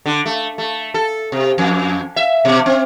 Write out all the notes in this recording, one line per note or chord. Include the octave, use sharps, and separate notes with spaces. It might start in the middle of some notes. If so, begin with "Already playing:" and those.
D3
A3
A3
A4
C3
F2
E5
B2
C4